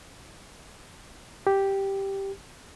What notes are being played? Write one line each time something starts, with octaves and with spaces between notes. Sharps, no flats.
G4